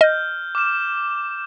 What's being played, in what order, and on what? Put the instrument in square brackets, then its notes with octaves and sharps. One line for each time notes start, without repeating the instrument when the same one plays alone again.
[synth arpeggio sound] D#5 [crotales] F6 G6
[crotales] D6 F6 E7